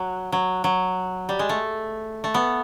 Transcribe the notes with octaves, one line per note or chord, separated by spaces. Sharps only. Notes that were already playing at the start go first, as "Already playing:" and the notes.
Already playing: F#3
F#3
F#3
G3
G#3
A3
A3
B3